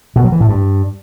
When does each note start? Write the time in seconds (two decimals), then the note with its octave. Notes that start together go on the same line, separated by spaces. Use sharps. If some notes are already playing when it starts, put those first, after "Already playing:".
0.16 B2
0.24 F#3
0.32 E3
0.40 A2
0.49 G2